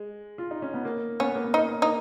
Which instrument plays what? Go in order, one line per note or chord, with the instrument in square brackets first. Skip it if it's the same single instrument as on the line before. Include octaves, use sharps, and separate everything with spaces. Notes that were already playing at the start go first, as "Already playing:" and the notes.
Already playing: [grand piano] G#3
F4
D#4
C#4
B3
A#3
[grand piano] B3 [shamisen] C#4
[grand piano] A#3
B3
[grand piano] C#4 [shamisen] D#4
[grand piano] A#3 [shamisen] D#4